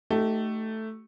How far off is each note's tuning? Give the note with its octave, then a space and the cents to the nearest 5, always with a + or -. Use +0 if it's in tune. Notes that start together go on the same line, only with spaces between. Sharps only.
A3 +0 D#4 +0 G4 -35